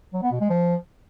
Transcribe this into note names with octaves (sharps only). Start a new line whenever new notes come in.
F#3
B3
B2
G#3
F3